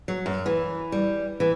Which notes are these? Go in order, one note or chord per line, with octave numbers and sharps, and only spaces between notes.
F#3
F#2
E3
G3
E3